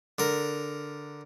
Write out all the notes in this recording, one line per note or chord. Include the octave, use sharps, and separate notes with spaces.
D3 A#4